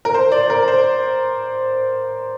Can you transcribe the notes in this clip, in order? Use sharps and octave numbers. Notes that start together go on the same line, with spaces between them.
A#4
C5
D5
A#4
C5